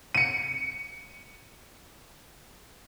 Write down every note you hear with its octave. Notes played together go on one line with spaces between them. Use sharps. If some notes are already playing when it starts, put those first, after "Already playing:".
C#7 D#7